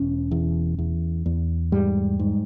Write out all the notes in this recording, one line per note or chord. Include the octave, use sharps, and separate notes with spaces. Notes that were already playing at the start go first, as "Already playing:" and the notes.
Already playing: E1 C#4
E2
E2
E2
G#2 G3
G#2